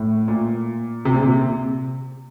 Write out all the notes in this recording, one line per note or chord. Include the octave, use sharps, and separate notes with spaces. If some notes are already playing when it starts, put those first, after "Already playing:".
Already playing: A2
A#2
C3
A#2
C3